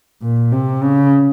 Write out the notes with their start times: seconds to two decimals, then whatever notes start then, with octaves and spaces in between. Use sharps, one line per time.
0.23 A#2
0.52 C3
0.83 C#3